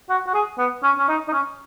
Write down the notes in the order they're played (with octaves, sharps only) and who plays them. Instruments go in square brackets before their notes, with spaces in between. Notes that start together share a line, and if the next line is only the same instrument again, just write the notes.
[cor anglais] F#4
F#4
G#4
B3
C#4
C#4
D#4
D#4
C#4